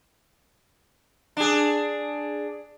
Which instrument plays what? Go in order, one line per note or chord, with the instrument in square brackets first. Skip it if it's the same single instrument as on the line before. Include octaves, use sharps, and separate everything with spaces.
[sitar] D4 G#4